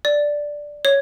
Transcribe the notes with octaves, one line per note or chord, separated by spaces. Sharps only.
D5
C#5